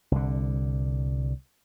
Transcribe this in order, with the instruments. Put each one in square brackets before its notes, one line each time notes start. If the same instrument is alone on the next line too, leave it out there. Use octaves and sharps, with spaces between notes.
[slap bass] C2 D3